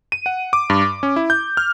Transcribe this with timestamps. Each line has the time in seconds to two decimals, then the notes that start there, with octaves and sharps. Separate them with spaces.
0.12 D#7
0.26 F#5
0.53 D6
0.70 G2
0.82 D6
1.03 C#4
1.16 E4
1.30 G6
1.57 F6